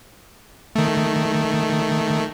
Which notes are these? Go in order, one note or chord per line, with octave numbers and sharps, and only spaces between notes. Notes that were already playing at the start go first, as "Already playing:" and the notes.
D#3 A3